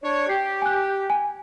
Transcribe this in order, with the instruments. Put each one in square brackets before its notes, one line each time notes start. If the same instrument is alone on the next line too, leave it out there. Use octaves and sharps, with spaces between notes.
[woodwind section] D4 C#5
[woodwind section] G4 [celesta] C7
[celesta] G#5 F#6
G#5